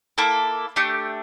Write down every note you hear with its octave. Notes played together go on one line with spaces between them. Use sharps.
A#3 E4 A4
A3 D4 G4